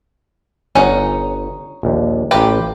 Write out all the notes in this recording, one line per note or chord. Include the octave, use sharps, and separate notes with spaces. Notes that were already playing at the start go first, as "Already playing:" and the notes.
G1 C#4 D#4 F#5
A#1 D#2
A1 F4 G4 B4 A#5